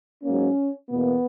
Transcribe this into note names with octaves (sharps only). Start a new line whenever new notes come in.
G#2 F#3 A#3 C#4
E2 B2 A#3 B3